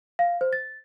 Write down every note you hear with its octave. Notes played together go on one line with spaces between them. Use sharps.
F5
C5
A6